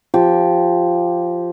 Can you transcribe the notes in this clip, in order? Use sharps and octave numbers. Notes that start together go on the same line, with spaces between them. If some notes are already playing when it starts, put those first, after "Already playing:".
F3 G4